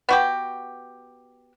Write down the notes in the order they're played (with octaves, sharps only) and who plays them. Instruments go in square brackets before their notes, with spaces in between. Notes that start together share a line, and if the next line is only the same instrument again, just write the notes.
[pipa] B3 F#4 G4